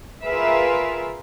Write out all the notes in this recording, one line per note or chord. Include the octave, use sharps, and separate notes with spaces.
F4 G#4 A#4 B4 E5 F5